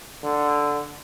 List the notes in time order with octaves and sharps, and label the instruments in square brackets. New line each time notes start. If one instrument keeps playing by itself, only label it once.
[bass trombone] D3